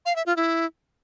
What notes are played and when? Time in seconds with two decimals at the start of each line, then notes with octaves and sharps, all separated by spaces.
0.06 F5
0.16 E5
0.26 F4
0.36 E4